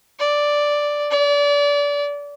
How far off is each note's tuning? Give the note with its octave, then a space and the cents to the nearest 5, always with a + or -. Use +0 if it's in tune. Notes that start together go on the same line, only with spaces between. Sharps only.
D5 +0
D5 -30